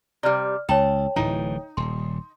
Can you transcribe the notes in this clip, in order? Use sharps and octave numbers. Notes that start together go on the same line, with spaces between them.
C3 G3 D5 F6
C#2 C#5 G5 A5
D1 A2 E3 D#4
D#1 C6